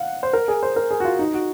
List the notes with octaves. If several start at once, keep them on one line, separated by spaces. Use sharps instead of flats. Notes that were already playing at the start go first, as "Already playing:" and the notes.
Already playing: F5 F#5
C5
A#4
G#4
C5
A#4
G#4
F#4
F4
D#4
F#4